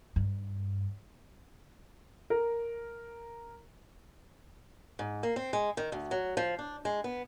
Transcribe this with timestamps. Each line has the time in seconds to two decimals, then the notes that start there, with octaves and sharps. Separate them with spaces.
0.16 G2
2.30 A#4
4.99 G#2
5.23 A#3
5.36 C4
5.53 G#3
5.77 D#3
5.92 D2
6.11 F#3
6.37 F3
6.59 D4
6.85 G#3
7.04 B3